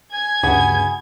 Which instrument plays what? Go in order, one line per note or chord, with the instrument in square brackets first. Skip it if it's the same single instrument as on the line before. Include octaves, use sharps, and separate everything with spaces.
[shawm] G#5 [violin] G#6
[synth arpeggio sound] D2 G2 C#3 [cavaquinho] F#4 G#4 B5